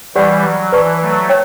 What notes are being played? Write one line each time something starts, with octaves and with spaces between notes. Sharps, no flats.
E3 G3 G4 D5 F#5
F#3
E3 B4 D5 A5 C#6
F#3 A3
C#5 G5